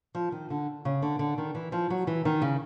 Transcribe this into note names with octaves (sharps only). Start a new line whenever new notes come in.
F3
D#3
D3
C#3
D3
D3
D#3
E3
F3
F#3
E3
D#3
C#3